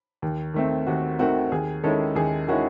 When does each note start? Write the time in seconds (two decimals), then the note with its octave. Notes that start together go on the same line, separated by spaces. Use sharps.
0.22 D#2
0.54 D#3 A3 C4
0.87 D#2 F#4
1.19 D#3 A3 C4 F#4
1.52 D#2 G#4
1.84 D#3 G#3 C#4 E4 A4
2.15 D#2 G#4
2.48 D#3 G#3 C#4 E4 F#4